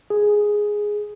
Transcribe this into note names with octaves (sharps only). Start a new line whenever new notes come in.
G#4